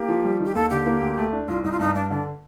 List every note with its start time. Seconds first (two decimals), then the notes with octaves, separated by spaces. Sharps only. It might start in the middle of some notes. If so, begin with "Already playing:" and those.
Already playing: A#3 G4
0.08 F3
0.24 G3
0.40 D#3
0.45 G4
0.55 D#2 A4
0.70 D3 G4
0.86 A#3
1.01 D2
1.17 A3
1.33 D4
1.48 C2 F4
1.64 C2 D#4
1.72 F4
1.79 G2 D#4
1.95 G2 D4
2.10 D3 D4